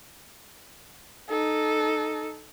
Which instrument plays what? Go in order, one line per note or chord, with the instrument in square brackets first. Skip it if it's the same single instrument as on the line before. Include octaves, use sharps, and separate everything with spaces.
[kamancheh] D#4 A4